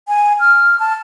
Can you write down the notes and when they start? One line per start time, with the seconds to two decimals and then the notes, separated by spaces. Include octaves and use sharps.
0.08 G#5
0.40 F6
0.80 A5